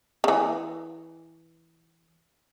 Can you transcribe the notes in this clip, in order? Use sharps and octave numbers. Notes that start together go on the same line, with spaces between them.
C#3 E3